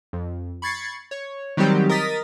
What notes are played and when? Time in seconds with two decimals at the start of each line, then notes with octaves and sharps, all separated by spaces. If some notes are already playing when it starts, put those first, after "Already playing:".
0.13 F2
0.62 B5 C#6 G#6 A6 C7 C#7
1.11 C#5
1.57 D#3 F#3 G3 C4 D#4 G4
1.89 A#4 D#5 D#6 A6 B6